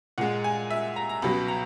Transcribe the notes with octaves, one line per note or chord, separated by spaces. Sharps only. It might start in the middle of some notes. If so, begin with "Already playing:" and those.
A#2 G#3 F#5
G#5
E5
A#5
A#5
C#2 B2 F#3 B5
A#5